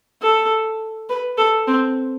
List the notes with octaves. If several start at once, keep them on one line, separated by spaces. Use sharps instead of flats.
A4
B4
A4
C4